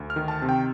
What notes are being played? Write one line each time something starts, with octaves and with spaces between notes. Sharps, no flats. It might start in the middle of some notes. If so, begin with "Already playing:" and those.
Already playing: D2
F6
D#3
A5
C3
G5